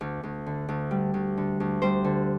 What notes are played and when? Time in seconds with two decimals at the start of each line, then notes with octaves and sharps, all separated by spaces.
0.01 D2
0.23 D2
0.46 D3
0.68 D2
0.91 G3
1.14 D2
1.37 D3
1.60 D2
1.82 G3 C5
2.04 D3